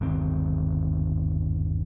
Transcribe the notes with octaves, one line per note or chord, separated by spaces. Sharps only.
G1 D#2 D#3 C4